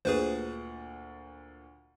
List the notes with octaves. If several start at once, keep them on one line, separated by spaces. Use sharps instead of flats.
D2 A#2 G#4 B4 C5